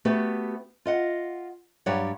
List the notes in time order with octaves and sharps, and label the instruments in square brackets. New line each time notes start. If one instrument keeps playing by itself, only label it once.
[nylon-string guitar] A3 B3 F#4 G4 B4
F4 D#5 F#5
G2 F#3 G4 C#5 D5 F#5